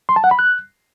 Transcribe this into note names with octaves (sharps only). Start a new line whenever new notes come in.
C6
A5
F#5
B5
F#6